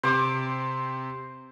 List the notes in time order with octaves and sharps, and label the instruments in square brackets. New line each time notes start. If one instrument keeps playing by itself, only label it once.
[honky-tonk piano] C3 [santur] C5 D6